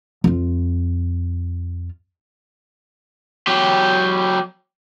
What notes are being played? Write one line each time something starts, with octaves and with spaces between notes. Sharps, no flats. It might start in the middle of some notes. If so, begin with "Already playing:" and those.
F2 F4
F#3 G4